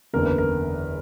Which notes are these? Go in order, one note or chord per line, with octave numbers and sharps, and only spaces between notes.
F#1 E2 D3 A#4
B4
A#4